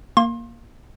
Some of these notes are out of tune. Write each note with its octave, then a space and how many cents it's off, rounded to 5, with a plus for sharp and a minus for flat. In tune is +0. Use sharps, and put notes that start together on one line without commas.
A#3 +0 C6 +30